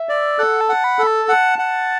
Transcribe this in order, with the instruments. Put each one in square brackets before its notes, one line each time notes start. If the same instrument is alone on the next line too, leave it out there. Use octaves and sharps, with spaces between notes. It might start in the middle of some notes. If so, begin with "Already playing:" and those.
Already playing: [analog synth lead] E5
[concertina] D5
[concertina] A4 [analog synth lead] F#5
[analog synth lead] A5
[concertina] F#5
[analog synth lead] B5
[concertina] A4
[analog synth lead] A5
[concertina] F#5 [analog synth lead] A5
[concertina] F#5